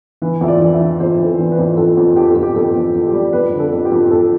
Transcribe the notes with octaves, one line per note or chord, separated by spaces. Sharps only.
E3 B4
F2 E5
D5
E3
E5
E3
F2 C5
E3
A4
E3
B4
F2
F2 A4
F2
F2 G4
A4
F2
G4
F2 A4
F2
F2
G4
G3
F2 B4
D3
A4
F2
G4
F2
F2 A4